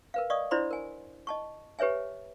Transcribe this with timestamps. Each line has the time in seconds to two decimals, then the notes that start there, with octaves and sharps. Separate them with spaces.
0.14 A#4 B4 F5
0.30 D5 D#5 F5 C#6 D#6
0.51 D4 E4 C5 D5 B5 C6
0.71 A#4 G#5
1.27 D#5 A5 C#6
1.79 G4 B4 C#5 E5 G#5